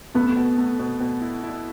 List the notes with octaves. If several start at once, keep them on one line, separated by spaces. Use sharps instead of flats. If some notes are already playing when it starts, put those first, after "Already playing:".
A3 B3
B2
A3
B2
B2
E4
E4